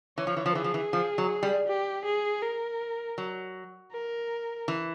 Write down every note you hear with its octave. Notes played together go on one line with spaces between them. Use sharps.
E3 C#5
F3
E3
F3
E3 G#4
F3
E3
F3
F#3
G3
G4
G#4
A#4
F#3
A#4
E3